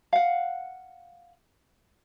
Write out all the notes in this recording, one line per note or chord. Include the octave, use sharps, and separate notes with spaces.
F5 F#5